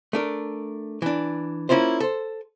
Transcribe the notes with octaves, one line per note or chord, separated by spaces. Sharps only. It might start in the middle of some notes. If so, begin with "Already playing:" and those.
A3 D4 A#4
E3 D4
A#3 C#4 E4 F4 C5
A4 C5